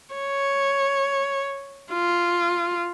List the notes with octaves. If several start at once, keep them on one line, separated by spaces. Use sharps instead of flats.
C#5
F4